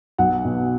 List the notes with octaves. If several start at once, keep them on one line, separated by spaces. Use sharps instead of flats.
B1 F#5
B2